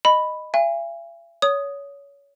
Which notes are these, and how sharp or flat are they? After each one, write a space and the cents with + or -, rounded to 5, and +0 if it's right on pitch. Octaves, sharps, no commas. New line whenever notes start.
D#5 -10 B5 +0
E5 +45 G#5 -35
C#5 +25 D#6 +0